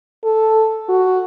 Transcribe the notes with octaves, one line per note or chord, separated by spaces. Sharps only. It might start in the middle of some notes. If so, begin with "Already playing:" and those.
A4
F#4